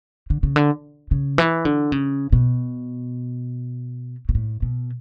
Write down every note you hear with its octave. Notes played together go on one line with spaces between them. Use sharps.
D3
C#3
D3
C#3
E3
D3
C#3
B2
B2
A2
B2